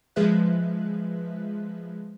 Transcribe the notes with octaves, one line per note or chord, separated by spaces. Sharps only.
F3 G#3 G#4 B4 E5 F#6